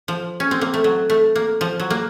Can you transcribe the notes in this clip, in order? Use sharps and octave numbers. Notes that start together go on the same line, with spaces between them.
F3
C#4
C4
A#3
A3
F#3
A3
A#3
F3
F#3
A#3